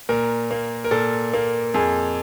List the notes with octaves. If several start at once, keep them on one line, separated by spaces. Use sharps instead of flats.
A#2 A#4
A#3
A#4
A#2 A4
A#3
F2 G#4